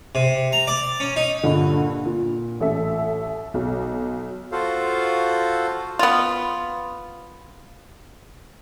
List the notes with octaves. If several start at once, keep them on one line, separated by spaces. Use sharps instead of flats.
C3
A#5
D5
C#4
D#4
G2 A#2 D3
A#2
A1 A4 E5
B1
F4 F#4 A4 C5 F5
B3 F4